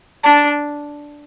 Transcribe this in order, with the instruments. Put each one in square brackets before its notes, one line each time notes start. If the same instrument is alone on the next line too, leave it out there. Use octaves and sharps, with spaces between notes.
[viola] D4 [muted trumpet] A5